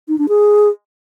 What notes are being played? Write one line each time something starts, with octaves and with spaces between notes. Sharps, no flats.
D#4
D4
G#4